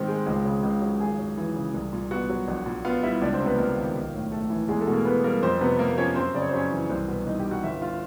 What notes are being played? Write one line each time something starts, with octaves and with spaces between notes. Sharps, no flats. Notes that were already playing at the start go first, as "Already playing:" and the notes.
Already playing: G#2 D#3 C4 G4
G#3
C#2
C#3
C#2
F#3
G#1 G#4 G#5
F#2
E3
C#3
C2
A#2
B3 F#4 F#5
F#3
A#1
A#2
B3 F4 F5
G3 E4 E5
C#2 D4 D5
C4 C5
C3
B3 B4
C#2 A#3 A#4
D#3
B1
A2
A3 A4
E3
E2 G#3 G#4
A3 A4
B2
A#3 A#4
B3 B4
G3 A#3 A#4
F2 C4 C5
C3 B3 B4
A#3 A#4
F3 C#4 C#5
F#2 C4 C5
C#3 D5
C#5
C5
F#2 C#4 C#5
E3
C2 C4 C5
B2 B3 B4
C2 D#4 D#5
G4 G5
G3
F#4 F#5
G1 E4 E5
F4 F5